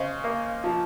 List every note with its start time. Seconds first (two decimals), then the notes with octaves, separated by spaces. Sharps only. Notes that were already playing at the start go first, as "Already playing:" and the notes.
Already playing: C#3 C5 D#5
0.24 A#3
0.64 F3